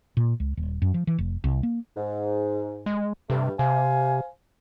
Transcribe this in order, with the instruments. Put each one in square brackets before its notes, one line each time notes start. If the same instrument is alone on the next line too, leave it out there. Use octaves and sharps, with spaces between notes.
[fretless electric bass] A#2
C#2
D#1
F#2
F3
E3
F1
C2
A#3
[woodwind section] G#2
[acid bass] G#3
[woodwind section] G2 A3 [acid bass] C3
[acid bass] C3 [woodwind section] C5 F5 G#5